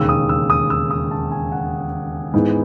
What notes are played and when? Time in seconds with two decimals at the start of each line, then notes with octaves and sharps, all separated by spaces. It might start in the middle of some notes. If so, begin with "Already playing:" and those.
Already playing: E1 D#2 C#3 E6
0.09 D#6
0.29 E6
0.50 D#6
0.70 E6
0.91 D#6
1.11 A5
1.31 G#5
1.52 F#5
2.34 G#2 E3 B3